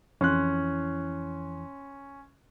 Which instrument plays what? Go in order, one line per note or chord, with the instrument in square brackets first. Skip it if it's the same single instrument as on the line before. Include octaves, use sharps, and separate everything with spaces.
[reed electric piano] F2 E3 E4 [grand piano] C#4 C6 F#6